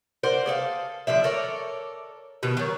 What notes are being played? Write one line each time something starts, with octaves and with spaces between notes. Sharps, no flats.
A#4 C5 D5 F#5
G#4 A4 D5 F5
D3 F3 D4 E5
A4 A#4 C#5 D5
B2 D#3
D#3 F#3